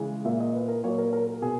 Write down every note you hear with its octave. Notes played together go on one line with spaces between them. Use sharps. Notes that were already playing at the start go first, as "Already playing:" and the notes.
Already playing: C#3 E3 G#3
A#2 A#3 E5
D#5
B4
A#4
A#2 F#3 A#3 C#5
A#4
A#4
A#4
B2 G#4